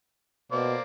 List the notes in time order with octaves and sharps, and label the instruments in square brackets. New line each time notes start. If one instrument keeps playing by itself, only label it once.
[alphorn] B2 [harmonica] A#3 C5 D5